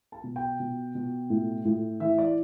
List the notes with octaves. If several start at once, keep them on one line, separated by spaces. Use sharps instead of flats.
A5
B2
G5
B2
B2
A2
A2
E3 E5
D5